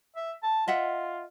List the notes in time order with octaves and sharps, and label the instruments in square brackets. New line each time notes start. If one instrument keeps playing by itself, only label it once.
[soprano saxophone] E5
A5
[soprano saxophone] F4 [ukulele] D#5 E5 F#5